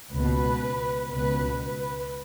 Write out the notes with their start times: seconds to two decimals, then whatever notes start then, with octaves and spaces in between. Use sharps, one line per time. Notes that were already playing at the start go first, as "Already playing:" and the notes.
0.13 C#2 B2 B4
1.10 C#2 B2 B4
1.59 B4